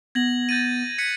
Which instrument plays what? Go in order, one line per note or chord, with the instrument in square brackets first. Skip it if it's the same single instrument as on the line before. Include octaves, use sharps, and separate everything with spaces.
[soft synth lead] B3 [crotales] G#6 A#6 F#7
[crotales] G6 A6 D#7
[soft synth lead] F#6 [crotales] G#6 B6 C#7